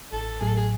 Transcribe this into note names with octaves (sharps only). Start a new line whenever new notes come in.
A1 A4
A2 F#3 G#4
A4
G#4